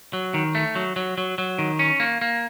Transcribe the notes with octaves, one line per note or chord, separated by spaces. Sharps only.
F#3
D#3
A3
F#3
F#3
F#3
F#3
D#3
C#4
A#3
A#3